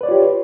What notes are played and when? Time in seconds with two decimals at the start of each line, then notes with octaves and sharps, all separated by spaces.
0.01 B4
0.03 D5
0.06 C#5
0.09 F4
0.11 G4